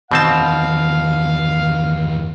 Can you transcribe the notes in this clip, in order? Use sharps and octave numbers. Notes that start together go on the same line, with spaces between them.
E2 B2 D#3 C4 F5 A5